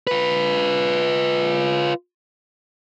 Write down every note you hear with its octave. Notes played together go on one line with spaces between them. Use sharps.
F4 B4